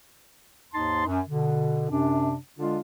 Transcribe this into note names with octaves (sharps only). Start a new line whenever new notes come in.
D#2 G#2 D#4 A5 C6
F#2
B2 D3
F#2 C3 D4
D3 G#3 D4 F4